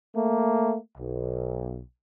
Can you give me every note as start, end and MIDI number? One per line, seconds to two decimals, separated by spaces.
0.15 0.77 57
0.15 0.77 58
0.98 1.79 35